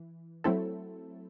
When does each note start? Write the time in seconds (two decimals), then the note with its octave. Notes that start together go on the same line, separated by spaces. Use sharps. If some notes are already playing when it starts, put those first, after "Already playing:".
Already playing: E3
0.44 F#3 A3 C4 E4 A4